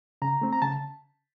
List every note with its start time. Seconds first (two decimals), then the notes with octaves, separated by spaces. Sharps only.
0.22 C#3 A#5
0.41 A3 C4
0.53 A#5
0.62 C#3 A5